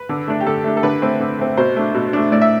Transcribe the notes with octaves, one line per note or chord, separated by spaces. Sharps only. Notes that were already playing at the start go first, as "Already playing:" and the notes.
Already playing: B4
D3
A3 D4
G4
D3 A4
A3 D4
A4
D3 B4
A3 C4
D3
A3 C4
B2 C5
A3 D4
B2
A3 D4
A2 D5
E5